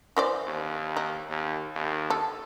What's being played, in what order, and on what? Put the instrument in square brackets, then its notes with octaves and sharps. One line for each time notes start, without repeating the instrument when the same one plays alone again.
[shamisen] E3 C5 D5
[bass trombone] D#2
[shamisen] D#4
[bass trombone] D#2
D#2
[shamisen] A4